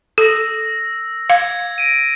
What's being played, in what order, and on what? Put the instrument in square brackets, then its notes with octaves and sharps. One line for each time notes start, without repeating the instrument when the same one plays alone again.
[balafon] A4 [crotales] E6 A#6
[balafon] F5 [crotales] G#6
[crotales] A#6 D7 D#7